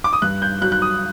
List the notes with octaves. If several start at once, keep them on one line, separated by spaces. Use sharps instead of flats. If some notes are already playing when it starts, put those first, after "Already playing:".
D6
D#6
G2 F#6
G6
F#3 F#6
F#6
D#6